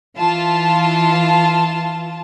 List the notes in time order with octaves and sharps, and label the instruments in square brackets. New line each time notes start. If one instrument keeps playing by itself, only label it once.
[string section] E3 F4 A5